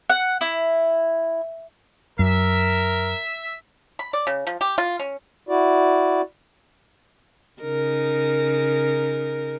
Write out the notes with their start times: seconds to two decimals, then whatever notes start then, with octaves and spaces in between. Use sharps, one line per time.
0.10 F#5
0.41 E4
2.19 F#2 A#4 E5
3.99 B5
4.13 D5
4.27 C#3
4.47 F3
4.61 G4
4.78 F4
4.99 C#4
5.49 E4 F#4 D5
7.61 C#3 D#4 A#4